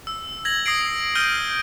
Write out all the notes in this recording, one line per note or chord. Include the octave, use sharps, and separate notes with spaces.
E6
G#6 A#6 F#7
D#6 A#6 C7 D7
D#6 F6 G6 D7 D#7 G7